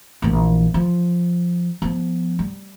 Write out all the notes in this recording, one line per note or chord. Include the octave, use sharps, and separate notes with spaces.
A#1 E3
F3
F3 B3
G3